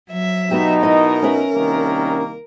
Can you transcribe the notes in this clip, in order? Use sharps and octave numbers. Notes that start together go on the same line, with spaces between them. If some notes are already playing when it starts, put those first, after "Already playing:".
F#3 E5
B2 B3 D#4 F#4 G4
E4 A#4 D#5
C#4 B4 E5
C2 D#3 A#3